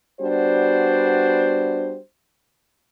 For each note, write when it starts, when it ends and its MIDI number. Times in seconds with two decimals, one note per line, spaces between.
0.20 1.98 55
0.20 1.98 59
0.20 1.98 62
0.20 1.98 66
0.20 1.98 72